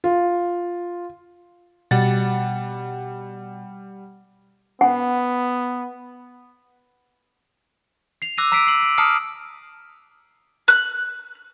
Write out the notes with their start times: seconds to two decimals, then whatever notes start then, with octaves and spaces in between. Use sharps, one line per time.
0.04 F4
1.91 B2 G3 F#5 A6
4.81 B3 F#5
8.22 C7 F7
8.37 D6 E6 F#6 A#6 C7 D#7
8.52 A#5 E6 B6 C7 D7 D#7
8.67 C7 F#7
8.82 D7
8.98 A5 A#5 D#6 F6 C7 C#7
10.68 F#6